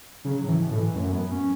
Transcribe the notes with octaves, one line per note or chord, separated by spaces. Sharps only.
C#3 F#3
A2
E3
B2
A2
E3
F#2 A3
B3
C#4